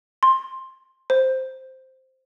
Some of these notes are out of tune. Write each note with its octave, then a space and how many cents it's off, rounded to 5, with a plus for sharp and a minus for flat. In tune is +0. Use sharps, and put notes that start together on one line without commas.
C6 +15
C5 +0